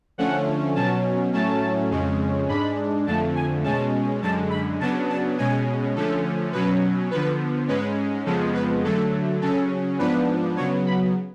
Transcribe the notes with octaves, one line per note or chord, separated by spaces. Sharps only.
D3 F3 A3 C#4 F#5
B2 F#3 C#4 A5
A2 F#3 A3 C#4 A5
F2 C#3 G#3 C#4
G#2 G#3 D4 B5
F2 D3 F3 A3 A5
G#5
B2 G#3 C#4 A5
F#2 D3 G#3 A5
B5
C#3 F#3 B3 D4 A5
A5
B2 G#3 C#4 G#5
D3 F3 A3 C#4 A4
B2 F#3 C#4 B4
D3 F3 B3 B4
G#2 G#3 C#4 B4
F2 C#3 F3 G#3 B3 A4
B4
D3 F#3 A3 A4
C#3 F#3 C#4 A4
G#2 F3 B3 D4 B4
C#3 F#3 B3 C#5
B5